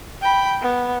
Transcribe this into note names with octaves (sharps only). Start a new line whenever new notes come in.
G5 B5
B3